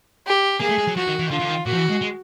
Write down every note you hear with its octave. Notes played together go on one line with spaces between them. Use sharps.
G4
A#3 G#4
A3
G#3
F#3
F3 F#4
D#3
E3
D#3
D3 F4
E3
D3
D#3
A#2 F#4
F3
E3
G#3
G#3